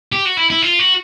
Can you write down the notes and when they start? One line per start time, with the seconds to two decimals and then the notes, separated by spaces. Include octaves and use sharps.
0.12 G4
0.25 F#4
0.37 E4
0.50 E4
0.62 F4
0.79 F#4